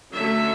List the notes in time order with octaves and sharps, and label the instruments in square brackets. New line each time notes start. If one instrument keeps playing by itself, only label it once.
[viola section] D3 F#3 A3 C#4 E5